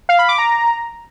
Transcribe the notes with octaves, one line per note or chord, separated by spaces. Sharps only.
F5
B5
D6
A#5